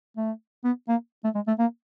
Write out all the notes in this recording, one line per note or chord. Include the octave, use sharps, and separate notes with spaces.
A3
B3
A#3
A3
G#3
A3
A#3